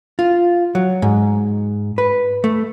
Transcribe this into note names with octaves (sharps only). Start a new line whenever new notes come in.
F4
F#3
G#2
B4
A3